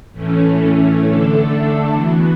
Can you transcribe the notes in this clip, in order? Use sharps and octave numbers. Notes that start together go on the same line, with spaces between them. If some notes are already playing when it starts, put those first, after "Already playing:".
A2 E3 A3 C#4
D3 A3 D4 A4
E3 B3 F#4